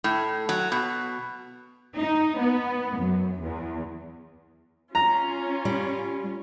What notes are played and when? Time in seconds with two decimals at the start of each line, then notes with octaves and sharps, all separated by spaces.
0.04 A2
0.49 F#3
0.72 B2
1.98 D#4
2.38 B3
2.98 F#2
3.41 E2
4.95 C#4 F4 A#5
5.65 G3